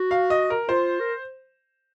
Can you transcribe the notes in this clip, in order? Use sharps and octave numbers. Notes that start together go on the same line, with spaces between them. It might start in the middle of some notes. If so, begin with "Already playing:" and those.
Already playing: F#4
F5
D#5
A#4
F4 C5
A#4